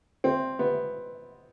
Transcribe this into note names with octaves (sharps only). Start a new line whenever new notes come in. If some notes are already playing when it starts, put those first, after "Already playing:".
C4
B3